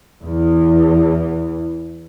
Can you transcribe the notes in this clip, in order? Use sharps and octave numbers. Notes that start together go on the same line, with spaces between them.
E2 E3